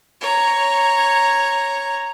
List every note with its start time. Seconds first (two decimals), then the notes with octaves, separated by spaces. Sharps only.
0.21 C#5 A#5